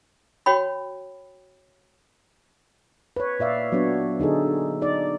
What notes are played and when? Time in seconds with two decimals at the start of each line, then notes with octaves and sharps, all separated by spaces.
0.46 F#4 C#5 G5 B5
3.16 B4 C#5
3.39 A#2 D5 E5 F5
3.72 F#3 B3 D4 C#5
4.19 D3 D#4 G#4 A4
4.81 D#4 D5